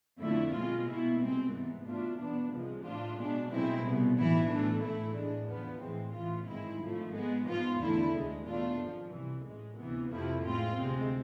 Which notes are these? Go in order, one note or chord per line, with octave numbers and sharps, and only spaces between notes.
F2 D3 A3 E4
B2 G#3 C4 F4
B2 B3 E4
C2 B2 G#3 C4
G#2 E3 B3
B2 A3 D4 F4
E2 B2 B3 D4
C2 C3 F3 G#3
A2 F3 A3 D4 F4
B2 G#3 B3 D4
B1 B2 G#3 C4 E4
C2 B2 B3
B1 A2 E3 B3 E4
A2 E3 A3 D4
A2 E3 A3 E4
A2 G#3 D4
E2 D3 F3 B3
A2 E3 G#3 C4
A1 A2 E3 B3 F4
G#1 G#2 G#3 C4 E4
G#1 G#2 F3 A3
G#2 G#3 B3
G#2 F3 B3 F4
E2 D3 A3 E4
D2 D3 G#3
E2 B2 A3 D4 F4
G#1 G#2 F3
C2 C3 E3
A1 A2 G#3
D2 C3 E3 B3
F2 C3 F3 A3 E4
A2 G#3 C4 F4
D2 C3 G#3 C4